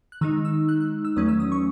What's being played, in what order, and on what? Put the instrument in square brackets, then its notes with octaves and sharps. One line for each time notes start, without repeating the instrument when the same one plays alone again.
[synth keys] F#6
D#3 G#3 D#4 E6
E6
F#6
F#6
E6
E2 D#3 F#3 A3 C#4 D#6
E6
D#6
C#6